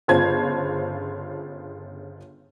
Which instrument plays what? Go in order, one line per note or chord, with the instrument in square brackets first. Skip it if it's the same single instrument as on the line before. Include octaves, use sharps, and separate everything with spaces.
[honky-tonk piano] G1 C#3 F4 C5 A5 G#6